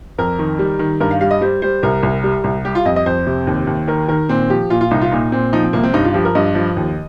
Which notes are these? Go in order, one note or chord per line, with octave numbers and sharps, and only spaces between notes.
F2 A#4
D#3
G3
D#3
G2 A#4
F5
G3 F5
D#5
G3 C5
G3 C5
C2 A#4
C2
G3
C2
G3 G4
F4
F2 D#5
D#5
F2 C5
C3
D#2
D#2
D#3 A#4
D#3 A#4
A#2 C4
F3 G4
A#2 F4
F4
C2 D#4
F4
A#2 D#4
A#2 C4
F3 D#4
C4
C2 A#3
C4
G2 D#4
F4
F3 G4
A#4
G2 D#5
F3
D#2